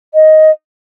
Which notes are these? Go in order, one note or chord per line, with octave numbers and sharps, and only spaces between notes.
D#5